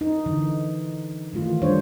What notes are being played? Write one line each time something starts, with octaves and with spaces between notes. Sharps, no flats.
D#4
D3 E3
D#3 E3 A3 F4
G3 D4 C5 C#5